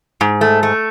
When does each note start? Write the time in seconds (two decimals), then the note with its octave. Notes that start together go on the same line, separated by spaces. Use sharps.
0.21 G#2
0.41 A3
0.63 A3